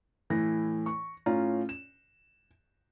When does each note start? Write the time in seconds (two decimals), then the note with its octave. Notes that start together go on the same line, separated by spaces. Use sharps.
0.30 A2 E3 A#6
0.86 C#6
1.26 A2 C#4 F4 A#5
1.69 E7